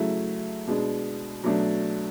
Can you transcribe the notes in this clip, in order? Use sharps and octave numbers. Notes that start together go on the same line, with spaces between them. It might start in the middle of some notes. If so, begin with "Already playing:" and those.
Already playing: C#3 F#3 A3 E4
B2 G#3 D4
B2 F#3 A3 D4